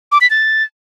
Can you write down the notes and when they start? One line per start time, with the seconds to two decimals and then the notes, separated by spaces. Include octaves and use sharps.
0.12 D6
0.21 B6
0.30 A6